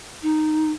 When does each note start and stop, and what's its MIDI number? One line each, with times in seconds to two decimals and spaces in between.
0.22 0.71 63